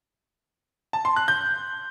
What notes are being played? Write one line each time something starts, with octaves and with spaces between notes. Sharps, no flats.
A5
C6
F#6
G6